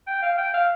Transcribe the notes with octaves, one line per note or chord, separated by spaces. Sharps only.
G5
F5
G5
F5